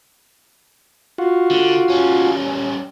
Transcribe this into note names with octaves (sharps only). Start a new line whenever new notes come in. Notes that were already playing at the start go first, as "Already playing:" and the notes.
F4 F#4
D3
G3 C#4